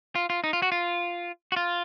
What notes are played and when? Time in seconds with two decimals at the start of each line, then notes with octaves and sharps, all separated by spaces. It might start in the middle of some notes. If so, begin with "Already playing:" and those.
0.15 F4
0.30 F4
0.44 D#4
0.53 F4
0.62 F#4
0.72 F4
1.52 F#4
1.56 F4